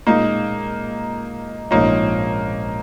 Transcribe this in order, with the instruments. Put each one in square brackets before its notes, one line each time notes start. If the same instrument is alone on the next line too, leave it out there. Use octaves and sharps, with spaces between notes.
[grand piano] A#2 G#3 C#4 F4 [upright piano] A#3 D#4
[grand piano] A#1 G#2 F3 C#4 F4 [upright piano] A#3 D#4